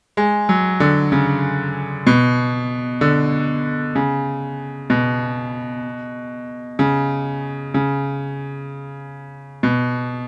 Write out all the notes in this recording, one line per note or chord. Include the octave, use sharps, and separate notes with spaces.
G#3
F#3
D3
C#3
B2
D3
C#3
B2
C#3
C#3
B2